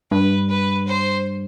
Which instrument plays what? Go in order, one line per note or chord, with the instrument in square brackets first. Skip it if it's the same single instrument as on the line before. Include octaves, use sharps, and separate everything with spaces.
[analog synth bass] G2 [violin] B4
[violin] B4
C5